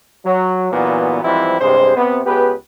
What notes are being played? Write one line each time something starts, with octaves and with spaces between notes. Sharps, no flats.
F#3
G2 A#2 E3 F#3 B3
G#2 E3 F3 G3 C4 E4
A1 G2 C3 G#3 G#4 C5
C3 B3
C#2 B3 G4 G#4 B4